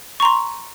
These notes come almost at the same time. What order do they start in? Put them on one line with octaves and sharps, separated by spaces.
C#6 A#5 C6